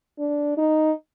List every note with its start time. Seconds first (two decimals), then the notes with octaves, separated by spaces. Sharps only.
0.19 D4
0.58 D#4